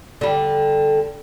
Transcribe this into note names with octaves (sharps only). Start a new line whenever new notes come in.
D3 G3